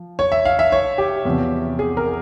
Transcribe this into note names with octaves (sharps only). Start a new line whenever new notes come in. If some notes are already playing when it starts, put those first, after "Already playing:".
Already playing: F3
C#5
E5
F5
E5
C#5
G4
E2 C3 F3
G#4
A#4